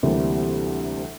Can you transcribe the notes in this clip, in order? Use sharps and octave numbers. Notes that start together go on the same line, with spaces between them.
D2 C3 E3 G3 A#3